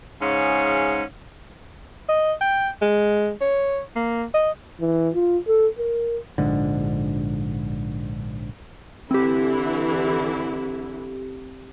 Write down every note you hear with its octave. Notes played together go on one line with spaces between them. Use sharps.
G#2 C#3 C#4
D#5
G5
G#3
C#5
A#3
D#5
E3
F4
A4
A#4
A#1 G#2 D3
D3 E3 C4 E4 G4